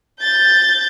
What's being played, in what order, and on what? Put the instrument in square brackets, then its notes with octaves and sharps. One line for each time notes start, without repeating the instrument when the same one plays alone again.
[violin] G6 A6